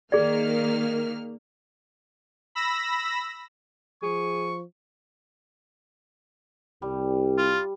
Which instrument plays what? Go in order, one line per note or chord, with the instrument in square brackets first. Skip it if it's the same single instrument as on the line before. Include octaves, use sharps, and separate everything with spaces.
[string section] D#3 A#3 F6 [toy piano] G#4 D5
[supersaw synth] B5 E6 A#6
[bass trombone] F3 [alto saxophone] G#4 [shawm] C#6
[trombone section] C2 [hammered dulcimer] G3
[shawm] F4